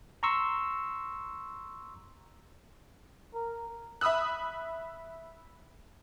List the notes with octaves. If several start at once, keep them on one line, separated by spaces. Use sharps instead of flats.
A#5 C6 C#6 E6
A#4
E5 B5 D#6 E6 F#6